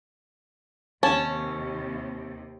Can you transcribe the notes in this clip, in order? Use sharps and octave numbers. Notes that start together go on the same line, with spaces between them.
D#2 C3 C#4 A5